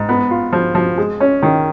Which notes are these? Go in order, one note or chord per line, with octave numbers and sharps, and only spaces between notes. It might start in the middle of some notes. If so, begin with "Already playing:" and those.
Already playing: G#2
B3
F4
F3
F3
G#3
C#4
D#3